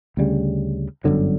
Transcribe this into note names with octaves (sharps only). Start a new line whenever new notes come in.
D2 C#3 G3
G1 F#2 D3 F#3